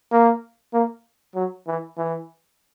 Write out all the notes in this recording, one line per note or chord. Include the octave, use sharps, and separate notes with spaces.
A#3
A#3
F#3
E3
E3